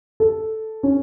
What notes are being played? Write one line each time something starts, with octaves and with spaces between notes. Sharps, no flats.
A4
C#4